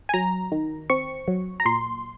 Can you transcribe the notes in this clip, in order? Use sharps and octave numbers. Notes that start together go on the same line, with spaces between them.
G#5
F#3 A#5
D#3
C4 C#6
F#3
A#5
A#2 C6